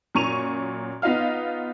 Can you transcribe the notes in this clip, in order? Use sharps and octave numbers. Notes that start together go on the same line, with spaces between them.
F#2 A#2 C#6 D#7 F7
B3 D#4 F4 D#5 F5 F6